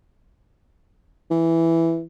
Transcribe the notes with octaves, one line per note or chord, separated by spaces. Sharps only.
E3